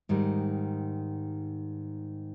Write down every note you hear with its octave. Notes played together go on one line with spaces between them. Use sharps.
G#2 D#3 G3